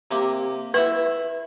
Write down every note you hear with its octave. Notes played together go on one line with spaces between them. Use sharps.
C3 A#3 G4
E4 B4 E5 F#5